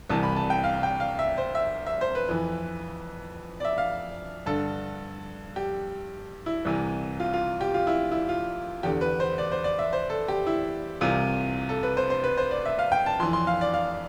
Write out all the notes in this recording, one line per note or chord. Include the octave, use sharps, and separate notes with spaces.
C2 C3 E3 A5
B5
A5
G5
F5
G5
F5
E5
C5
E5
E5
C5
B4
F2 E3
D5
E5
F5
G2 D3 A4
G4
E4
C2 C3 E3
F4
F4
G4
F4
E4
E4
F4
E2 D3 G4
B4
C5
D5
C5
D5
E5
C5
A4
G4
E4
C2 C3 E3 F4
A4
B4
C5
C5
B4
C5
D5
E5
F5
G5
A5
F2 E3 C6
C6
F5
D5
F5